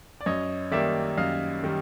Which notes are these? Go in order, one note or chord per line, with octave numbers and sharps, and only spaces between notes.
D5
F#2 C#5 D#5
D#3 G3 A#3 D5 E5
F#2 D#5 F5
D#3 G3